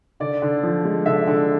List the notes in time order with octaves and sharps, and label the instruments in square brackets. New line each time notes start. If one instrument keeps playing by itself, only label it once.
[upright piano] D3 D5
D3
F3
G#3
D3 E5
D3